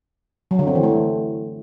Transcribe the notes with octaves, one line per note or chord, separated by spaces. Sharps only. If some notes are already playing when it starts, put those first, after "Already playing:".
F#3
D3
C4
E3
A3